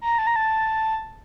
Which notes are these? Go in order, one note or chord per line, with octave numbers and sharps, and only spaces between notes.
A#5
A5
A#5
A5